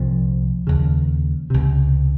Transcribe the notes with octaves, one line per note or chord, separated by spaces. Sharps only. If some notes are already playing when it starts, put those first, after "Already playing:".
Already playing: C2 A#2 F3
D#2 C#3
C#2 C3